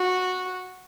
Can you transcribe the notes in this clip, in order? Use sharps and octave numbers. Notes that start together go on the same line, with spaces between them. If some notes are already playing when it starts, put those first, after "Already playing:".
Already playing: F#4